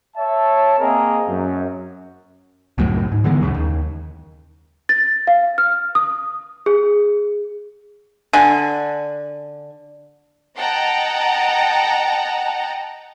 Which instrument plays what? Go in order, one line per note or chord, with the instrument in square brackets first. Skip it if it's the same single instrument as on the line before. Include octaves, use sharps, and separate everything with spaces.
[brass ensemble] C#5 E5 A5
A#3 C4 G#4 A#4 D#5
F#2
[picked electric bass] C#2 F#2 A2 F#3
G#2
D3 E3 G#3 B3
C#2 F#2 A#2 C#3
D#2
[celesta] A6
F5
F6
D#6
G#4
[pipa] D3 G#5
[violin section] D#5 F#5 G5 A5 A#5